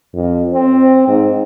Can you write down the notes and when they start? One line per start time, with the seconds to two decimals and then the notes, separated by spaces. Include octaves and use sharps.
0.14 F2
0.54 C4
1.08 G#2